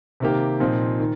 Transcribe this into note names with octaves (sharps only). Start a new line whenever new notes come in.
C3 D#3 A#3 G4
A#2 F3 C4 D#4
D#3